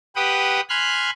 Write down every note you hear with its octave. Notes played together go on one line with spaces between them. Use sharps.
G4 B4 F#5 G5 D#6
G#5 B5 C6 F6 F#6